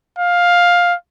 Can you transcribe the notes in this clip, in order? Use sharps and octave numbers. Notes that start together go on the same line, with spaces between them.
F5